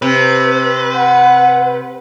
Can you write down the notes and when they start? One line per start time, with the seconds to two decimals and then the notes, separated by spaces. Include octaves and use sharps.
0.02 C3 B4
0.95 F#5